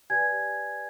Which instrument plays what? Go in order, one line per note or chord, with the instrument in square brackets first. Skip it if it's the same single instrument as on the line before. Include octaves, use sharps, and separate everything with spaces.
[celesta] G4 B4 D5 G#5 G#6